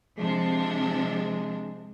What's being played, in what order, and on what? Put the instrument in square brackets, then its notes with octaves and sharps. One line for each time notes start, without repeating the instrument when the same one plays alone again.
[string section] C3 F3 D4 [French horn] G#3